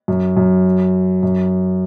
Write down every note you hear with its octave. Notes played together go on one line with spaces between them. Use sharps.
F#2
F#2
F#2